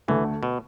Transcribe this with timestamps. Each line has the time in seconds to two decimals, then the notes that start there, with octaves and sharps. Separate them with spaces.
0.08 D2 D3 E3 A3
0.43 B2